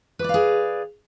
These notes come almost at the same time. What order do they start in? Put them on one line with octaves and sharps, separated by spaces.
B4 D5 F5 G#4